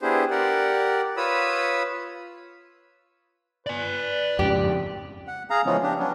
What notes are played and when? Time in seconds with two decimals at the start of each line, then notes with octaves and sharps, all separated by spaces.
0.02 B3 D4 E4 G4 G#4 C5
0.31 G4 A#4 D5 F#5
1.17 F4 B4 C#5 B5 D#6 E6
3.66 B4 D5 G#5
4.39 F2 G#2 C#3 G4
5.28 F#5
5.50 G#4 F5 A#5
5.66 C#3 E3 F3 G#3 B3 C#4
5.83 D4 G4
5.99 F#3 B3 C#4 D4